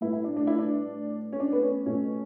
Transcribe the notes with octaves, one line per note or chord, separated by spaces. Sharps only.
A2 G3 B3 E4
E4
D4
D4
E4
D4
C#4
D4
B3
C#4
B2 A3 C#4